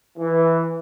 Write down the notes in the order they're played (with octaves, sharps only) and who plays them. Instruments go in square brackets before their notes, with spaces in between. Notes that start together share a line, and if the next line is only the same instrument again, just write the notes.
[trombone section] E3